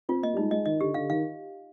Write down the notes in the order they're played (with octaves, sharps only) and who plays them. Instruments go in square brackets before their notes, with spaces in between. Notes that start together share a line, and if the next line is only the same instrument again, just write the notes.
[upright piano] C4 [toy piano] F4
[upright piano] A#3 [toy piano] D#5
[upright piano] G3
[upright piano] G#3 [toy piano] D#4
[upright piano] G#3 [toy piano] D#5
[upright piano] D#3 [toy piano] D#5
[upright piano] D3 [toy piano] G4
[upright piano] D3 [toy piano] F5
[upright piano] D#3 [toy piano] F5